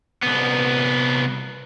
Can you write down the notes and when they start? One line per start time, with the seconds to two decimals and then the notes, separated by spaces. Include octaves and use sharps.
0.22 C2 B3